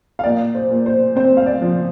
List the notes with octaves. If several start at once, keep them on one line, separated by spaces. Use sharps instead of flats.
F5
A#2 D5
C5
A#2
C5
C4 C5
F5
D5
F3